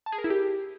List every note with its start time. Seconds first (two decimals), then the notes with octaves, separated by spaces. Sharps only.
0.06 A5
0.12 G#4
0.18 A#4
0.24 E4
0.30 G4